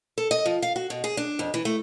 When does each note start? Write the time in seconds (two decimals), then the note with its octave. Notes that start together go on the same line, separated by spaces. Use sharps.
0.18 A4
0.31 D#5
0.46 F3
0.62 F5
0.76 F#4
0.90 B2
1.04 G#4
1.17 D4
1.39 F2
1.54 E3
1.65 A3